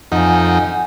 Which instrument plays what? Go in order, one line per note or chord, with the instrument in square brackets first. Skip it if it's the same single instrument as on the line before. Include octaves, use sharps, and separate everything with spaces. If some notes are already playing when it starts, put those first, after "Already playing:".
[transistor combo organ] F2 D#4 [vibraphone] F#5 G#5